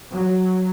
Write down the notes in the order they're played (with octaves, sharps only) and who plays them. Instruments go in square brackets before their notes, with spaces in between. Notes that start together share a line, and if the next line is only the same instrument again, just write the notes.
[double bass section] F#3